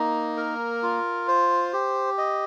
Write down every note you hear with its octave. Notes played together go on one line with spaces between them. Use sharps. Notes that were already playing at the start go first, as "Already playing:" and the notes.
Already playing: A#3 D#4
A#4
F4
C5
G4
D#5